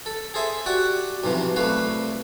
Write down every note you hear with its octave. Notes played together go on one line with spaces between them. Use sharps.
A4
G#4 A4 C5 E5 G#5
F#4 G4 D5 F#5
B1 C3 E3 F3
C2 A3 B4 F5